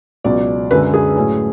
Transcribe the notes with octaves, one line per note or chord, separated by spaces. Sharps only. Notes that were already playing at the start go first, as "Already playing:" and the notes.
C#2 B2 F#3 D5
F#2 D3 G#3 B4
G#4
A2 F#3 C#4